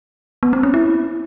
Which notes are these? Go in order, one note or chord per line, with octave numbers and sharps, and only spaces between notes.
B3
C4
C#4
E4